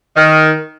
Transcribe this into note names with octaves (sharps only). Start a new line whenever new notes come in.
D#3